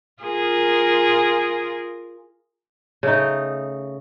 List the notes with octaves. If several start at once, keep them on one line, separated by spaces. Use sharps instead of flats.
F4 G#4 A#4
C#3 A3 D#4